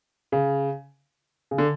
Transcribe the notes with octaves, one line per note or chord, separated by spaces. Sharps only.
C#3
C#3
D3